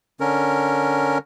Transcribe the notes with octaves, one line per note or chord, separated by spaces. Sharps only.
D3 C#4 A#4